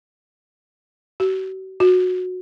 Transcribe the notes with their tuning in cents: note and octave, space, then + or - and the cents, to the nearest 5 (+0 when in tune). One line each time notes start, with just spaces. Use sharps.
F#4 +45
F#4 -15